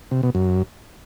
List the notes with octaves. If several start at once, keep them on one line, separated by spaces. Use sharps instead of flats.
C3
B2
F#2